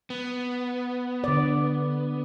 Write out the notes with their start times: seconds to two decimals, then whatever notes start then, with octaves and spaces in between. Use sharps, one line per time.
0.10 B3
1.24 D3 D5